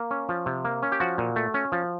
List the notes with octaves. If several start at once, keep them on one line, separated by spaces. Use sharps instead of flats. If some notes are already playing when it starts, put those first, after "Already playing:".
Already playing: A#3
C#4
F3
C3
A#3
C#4
G4
F3 F#4
A#2
A3
C#4
F3